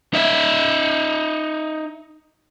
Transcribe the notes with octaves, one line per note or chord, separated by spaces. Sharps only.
D#4 E5